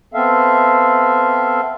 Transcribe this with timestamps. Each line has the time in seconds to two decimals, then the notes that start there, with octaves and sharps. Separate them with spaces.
0.14 B3 C4 A4 E5 F5